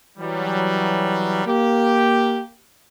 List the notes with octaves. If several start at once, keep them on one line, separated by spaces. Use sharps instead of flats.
E3 F#3 G3
A#3 G4